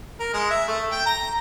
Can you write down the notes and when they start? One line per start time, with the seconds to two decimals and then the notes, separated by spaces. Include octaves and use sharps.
0.20 A#4
0.33 G#3
0.50 E5
0.68 A3
0.91 G5
1.06 A#5